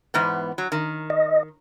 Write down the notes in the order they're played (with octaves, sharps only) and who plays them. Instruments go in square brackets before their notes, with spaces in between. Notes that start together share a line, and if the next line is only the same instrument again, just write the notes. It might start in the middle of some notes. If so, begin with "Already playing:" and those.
[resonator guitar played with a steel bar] E2 G#2 B3
F#3
D#3
[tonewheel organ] D#5